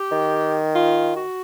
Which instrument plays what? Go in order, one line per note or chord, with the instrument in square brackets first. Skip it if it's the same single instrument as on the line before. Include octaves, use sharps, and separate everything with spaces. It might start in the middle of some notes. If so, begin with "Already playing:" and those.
Already playing: [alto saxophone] G4
[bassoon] D#3
[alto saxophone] F4
F#4